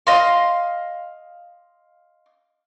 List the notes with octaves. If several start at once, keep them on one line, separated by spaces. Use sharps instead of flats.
D#5 F5 C6